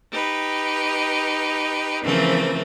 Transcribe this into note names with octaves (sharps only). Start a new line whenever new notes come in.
D#4 G4 B4
C#3 E3 F3 A3 C4 A#4